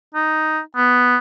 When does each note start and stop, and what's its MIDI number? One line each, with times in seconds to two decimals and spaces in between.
0.14 0.60 63
0.76 1.17 59